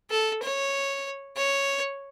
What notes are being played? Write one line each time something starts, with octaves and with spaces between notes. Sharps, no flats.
A4
C#5
C#5